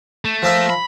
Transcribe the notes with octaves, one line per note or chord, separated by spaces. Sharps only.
A3
F3 A#4 E5
B5